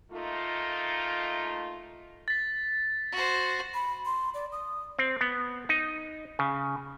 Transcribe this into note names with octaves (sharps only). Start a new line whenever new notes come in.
A3 A#3 D#4 F4
A6 B6
F#4 C5
B5
C6
D5
D#6
C4
B3
D#4
C#3